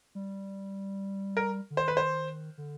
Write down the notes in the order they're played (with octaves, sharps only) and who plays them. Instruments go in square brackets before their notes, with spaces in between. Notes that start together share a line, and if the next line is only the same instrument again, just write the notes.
[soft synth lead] G3
[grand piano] A#4
[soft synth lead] D3
[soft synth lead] D#3 [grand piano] C5
[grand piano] B4
C5
[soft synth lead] D3